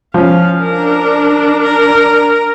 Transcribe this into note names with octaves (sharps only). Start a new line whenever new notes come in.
F3 C#4 F5
D4 A#4
A#4